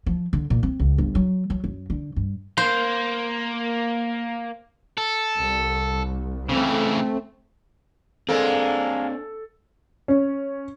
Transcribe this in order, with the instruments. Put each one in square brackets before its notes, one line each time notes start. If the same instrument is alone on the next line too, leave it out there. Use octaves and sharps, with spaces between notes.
[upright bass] F3
D3
A#2
C4
C#2
G1
F#3
F#3
F#2
D3
G2
[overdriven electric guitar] A#3 [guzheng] C5
[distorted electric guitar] A4
[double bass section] C2
[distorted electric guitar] C#3 E3 [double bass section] A3 C4
[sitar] G#3 A#3 [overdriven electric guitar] C4 D4 [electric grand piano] A4
[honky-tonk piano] C#4